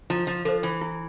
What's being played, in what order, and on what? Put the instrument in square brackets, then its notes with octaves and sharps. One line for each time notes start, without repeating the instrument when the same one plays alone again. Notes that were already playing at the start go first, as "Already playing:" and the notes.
[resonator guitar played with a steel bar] F3 [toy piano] E4
[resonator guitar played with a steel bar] F3
[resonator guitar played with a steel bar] F3 [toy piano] A4 C5
[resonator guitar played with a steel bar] E3
[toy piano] E4